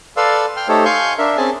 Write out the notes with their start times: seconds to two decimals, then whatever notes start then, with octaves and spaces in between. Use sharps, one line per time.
0.17 A4 B4 D5 F5 C6 E6
0.56 G5 C6 F6
0.68 A3 D#4 G4 A4 C5 C#5
0.85 F5 G#5 C6 C#6 G6
1.18 D4 A#4 E5
1.37 C4 C#4 G#4 G#5 A5